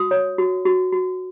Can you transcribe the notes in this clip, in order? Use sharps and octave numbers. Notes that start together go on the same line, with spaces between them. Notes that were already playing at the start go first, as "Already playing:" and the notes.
Already playing: F#4 D#6
C#5
F#4
F#4
F#4